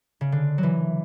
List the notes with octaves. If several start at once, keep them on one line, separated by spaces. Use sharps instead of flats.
C#3
D3
E3 F#3